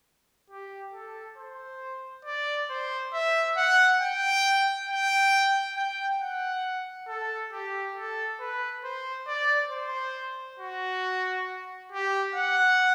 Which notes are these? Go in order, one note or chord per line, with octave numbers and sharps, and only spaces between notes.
G4
A4
C5
D5
C5
E5
F#5
G5
G5
G5
F#5
A4
G4
A4
B4
C5
D5
C5
F#4
G4
F#5